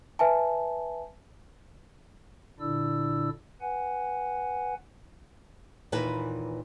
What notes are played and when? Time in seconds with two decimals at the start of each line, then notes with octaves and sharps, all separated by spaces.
0.19 B4 E5 G#5 A5
2.60 A#2 D3 D4 E4 D5 E6
3.61 B4 F#5 G#5
5.92 D#2 A#2 E3 B4 G#5